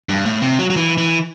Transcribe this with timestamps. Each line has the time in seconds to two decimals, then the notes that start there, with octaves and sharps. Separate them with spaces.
0.09 G2
0.25 A2
0.42 C3
0.59 F#3
0.70 F#3
0.76 E3
0.98 E3